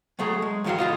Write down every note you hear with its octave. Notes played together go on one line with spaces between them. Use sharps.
F#3 A3 G#4 A#5
G#3
E2 G#2 D#3 F#3 F#4 F5
D2 A2 F4 D#5